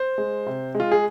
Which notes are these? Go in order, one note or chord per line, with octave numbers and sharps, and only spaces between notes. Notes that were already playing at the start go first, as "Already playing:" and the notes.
Already playing: C5
G#3
C3
G#3
F4
G#4